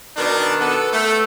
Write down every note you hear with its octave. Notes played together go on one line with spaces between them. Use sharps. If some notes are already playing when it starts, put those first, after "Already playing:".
B2 D#3 D4
B3 A4
A3